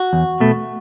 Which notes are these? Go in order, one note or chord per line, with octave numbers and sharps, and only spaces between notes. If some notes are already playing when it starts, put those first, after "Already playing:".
Already playing: F#4
E2
B2 A3